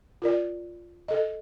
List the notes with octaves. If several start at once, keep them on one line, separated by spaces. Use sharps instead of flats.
F4 A#4 D5
A4 D#5